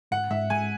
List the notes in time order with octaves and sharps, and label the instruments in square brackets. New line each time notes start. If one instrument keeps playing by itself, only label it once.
[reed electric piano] G#2 [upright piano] F#5
[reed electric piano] G#2 [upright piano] E5
[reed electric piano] G#3 [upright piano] G#5